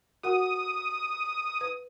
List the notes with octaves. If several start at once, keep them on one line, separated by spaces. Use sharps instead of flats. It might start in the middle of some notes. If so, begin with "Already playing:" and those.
F#4 A#4 F#5 D#6
B4